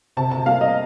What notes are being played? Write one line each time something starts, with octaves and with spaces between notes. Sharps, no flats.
C3 A5
A5
G3 A#3 F5
D#5